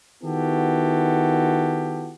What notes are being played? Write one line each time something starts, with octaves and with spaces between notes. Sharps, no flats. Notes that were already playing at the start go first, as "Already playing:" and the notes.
D#3 B3 E4 F#4 G4 A4